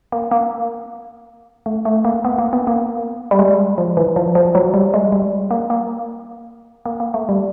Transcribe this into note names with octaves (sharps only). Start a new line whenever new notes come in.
A#3
A#3
A3
A3
A#3
B3
A#3
B3
A#3
G3
G#3
F3
E3
F3
F3
F#3
G3
G#3
G3
A#3
A#3
A#3
A#3
A3
G3